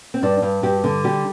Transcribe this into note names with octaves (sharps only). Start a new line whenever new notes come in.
C4
G2 D4
G2
G2 G4
D3
G3 G4